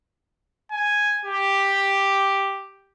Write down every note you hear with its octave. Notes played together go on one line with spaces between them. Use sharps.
G#5
G4